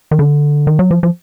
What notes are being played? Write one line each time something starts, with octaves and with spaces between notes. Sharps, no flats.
D#3
D3
D#3
F#3
F3
F3